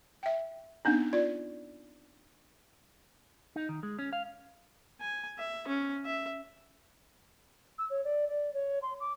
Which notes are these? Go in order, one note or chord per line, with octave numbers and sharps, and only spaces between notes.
E5 G5
B3 C4 D4 D#4
F4 D5
D#4
D#3
G#3
C#4
F5
G#5
E5
C#4
E5
E6
C#5
D5
D5
C#5
C6
D6